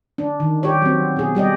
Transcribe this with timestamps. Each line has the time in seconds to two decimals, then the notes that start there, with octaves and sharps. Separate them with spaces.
0.18 D4
0.40 D#3
0.63 G4 C#5
0.82 F#3 C4
1.17 B2 G#4
1.35 G3 G4 D5 D#5